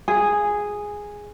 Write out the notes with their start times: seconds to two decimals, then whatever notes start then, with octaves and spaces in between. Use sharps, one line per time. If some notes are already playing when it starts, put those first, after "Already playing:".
0.08 G#4